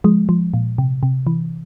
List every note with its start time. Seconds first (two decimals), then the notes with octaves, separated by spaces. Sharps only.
0.04 F3 G#3
0.29 F3
0.54 A#2
0.78 C3
1.03 C3
1.27 E3